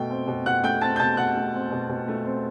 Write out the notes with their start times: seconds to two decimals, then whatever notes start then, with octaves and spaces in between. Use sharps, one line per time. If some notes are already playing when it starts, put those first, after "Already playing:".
Already playing: B2 A3 G5
0.10 C4
0.28 B2
0.46 B2 F#5 F#6
0.64 A3 G5 G6
0.81 C4 A5 A6
0.96 G6
0.99 B2 A5 A6
1.17 B2 F#5 F#6
1.36 A3
1.54 C4
1.72 B2
1.89 B2
2.08 A3
2.25 C4